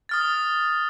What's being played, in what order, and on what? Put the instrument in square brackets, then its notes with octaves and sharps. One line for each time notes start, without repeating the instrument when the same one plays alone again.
[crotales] D#6 F6 A6